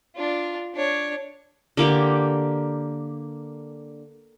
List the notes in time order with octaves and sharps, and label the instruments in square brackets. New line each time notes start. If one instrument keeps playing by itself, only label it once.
[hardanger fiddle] D4 F4
D4 C#5
[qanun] D3 A#3 G4